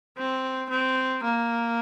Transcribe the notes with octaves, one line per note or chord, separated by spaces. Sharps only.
C4
C4
A#3